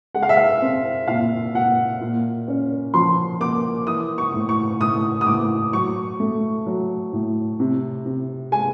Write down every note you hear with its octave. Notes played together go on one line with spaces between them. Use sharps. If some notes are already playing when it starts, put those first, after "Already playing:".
G#3 F#5
F5
E5
F5
C4
A#2 F5
A#2 F#5
A#2
C#4
F3 C6
A#3 D6
E3 D#6
C#6
A2
C#6
A2 D#6
D#6
A2 D6
F#3 C#6
A3
F#3
A2
C3
C3
G#3 G#5